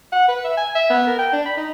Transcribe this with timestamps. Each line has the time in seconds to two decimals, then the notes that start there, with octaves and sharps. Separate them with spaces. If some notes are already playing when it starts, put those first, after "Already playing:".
0.12 F#5
0.28 B4
0.44 E5
0.57 G#5
0.75 E5
0.90 B3
1.07 A#4
1.18 G5
1.33 D4
1.45 B5
1.57 D#4